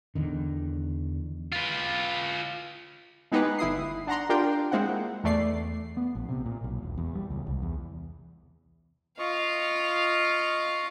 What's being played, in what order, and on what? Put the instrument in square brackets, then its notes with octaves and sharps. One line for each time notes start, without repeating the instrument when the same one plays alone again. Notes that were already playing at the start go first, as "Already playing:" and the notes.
[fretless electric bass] E2 D3 D#3
[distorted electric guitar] F4 B4
[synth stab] G#3 B3 D#4 G4 G#4 B4
G1 E4 D#6 C7
D4 F#5 A#5 C6
D4 F4 G4 A#4 G5 C6
G#3 A#3 C4 E4 F#5
E2 A3 D5 C7
[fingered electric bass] B3
A#1
C3
A#2
B1
E1
E2
G3
C#2
C2
E2
[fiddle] F4 F5 [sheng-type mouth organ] D#5 C#6